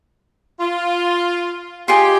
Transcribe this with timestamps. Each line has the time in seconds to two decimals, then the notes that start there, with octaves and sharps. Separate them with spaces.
0.60 F4
1.88 F4 G4 G#4 D#5 G#5